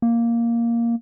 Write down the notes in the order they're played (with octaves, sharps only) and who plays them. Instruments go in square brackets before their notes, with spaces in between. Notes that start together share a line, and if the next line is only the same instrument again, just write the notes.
[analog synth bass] A#3